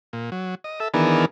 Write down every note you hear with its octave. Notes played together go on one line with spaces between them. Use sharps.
A#2
F#3
D#5
A4 E5
D#3 E3 B3 D4 G#4 A#4